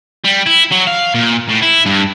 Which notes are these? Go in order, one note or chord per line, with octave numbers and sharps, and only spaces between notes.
G3
E4
F#3
F5
A#2
A2
E4
G2